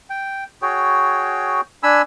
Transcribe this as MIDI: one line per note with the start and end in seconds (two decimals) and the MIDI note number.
0.10 0.44 79
0.62 1.61 66
0.62 1.61 68
0.62 1.61 73
0.62 1.61 79
1.83 2.02 62
1.83 2.02 80
1.83 2.02 83
1.83 2.02 88